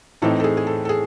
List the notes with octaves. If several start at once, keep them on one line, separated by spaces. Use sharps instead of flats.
A2 E3 C4 D#4 A4
A4
G#4
G#4
A4
A4
G#4